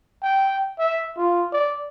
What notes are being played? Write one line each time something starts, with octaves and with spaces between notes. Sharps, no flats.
G5
E5
F4
D5